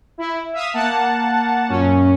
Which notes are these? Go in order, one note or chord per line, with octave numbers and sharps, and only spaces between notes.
E4
E5 F5 D#6
A#3 F#5 A5
F#2 A#2 C#4